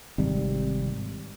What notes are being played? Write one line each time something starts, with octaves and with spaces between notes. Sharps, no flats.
G#1 C3 G3